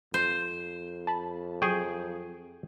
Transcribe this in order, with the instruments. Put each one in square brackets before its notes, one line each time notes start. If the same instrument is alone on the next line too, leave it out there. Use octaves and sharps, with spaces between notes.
[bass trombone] F2 [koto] C5
[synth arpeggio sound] A5 B5
[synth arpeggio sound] F#3 C#6 D#6 [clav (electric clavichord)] G#4 G5